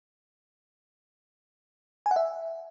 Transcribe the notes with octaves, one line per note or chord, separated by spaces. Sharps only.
G#5
F#5
E5